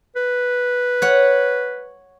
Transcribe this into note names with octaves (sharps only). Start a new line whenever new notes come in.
B4
C#5 F#5